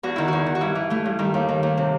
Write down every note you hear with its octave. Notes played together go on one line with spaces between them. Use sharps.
E2 F#4
D#3 E4
E2 F#4
D#3
F#4
G2 E4
E3
E3 A3
G2
D#3 G3
D#2
D#3
D#2
C3